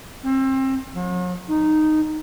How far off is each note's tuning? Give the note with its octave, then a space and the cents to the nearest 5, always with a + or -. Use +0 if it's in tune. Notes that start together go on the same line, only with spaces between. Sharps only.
C4 +30
F#3 -45
D#4 -10